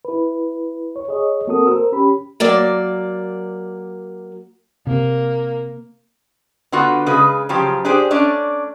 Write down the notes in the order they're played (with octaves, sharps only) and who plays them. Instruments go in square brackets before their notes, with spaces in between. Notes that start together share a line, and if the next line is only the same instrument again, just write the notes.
[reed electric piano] E4 B4
C#5
G#4 C#5 D#5
A#3 C4 F#4 A4 A#4 D#6
A#4 C5 E6
C#4 G4 B5
[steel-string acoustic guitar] F#3 A#3 D5
[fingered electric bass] C3 [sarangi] A#3
[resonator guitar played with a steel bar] D3 B3 F4 F#4
C#3 G#3 B4
C#3 F3 F#3 G4
D4 G4 G#4 C5 D5
A3 C#4 D4 D5